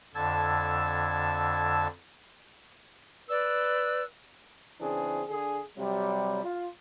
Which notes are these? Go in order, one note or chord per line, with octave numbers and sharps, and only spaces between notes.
F2 D3 A5 E6 G#6
B4 D5 E6
C#3 E3 C4 D4 G#4
D3 G#4
C3 F#3 G3
F4